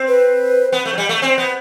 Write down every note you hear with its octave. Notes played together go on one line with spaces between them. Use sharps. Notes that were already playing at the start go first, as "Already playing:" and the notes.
Already playing: C4
B4
B3
A3
F#3
G3
A3
C4
B3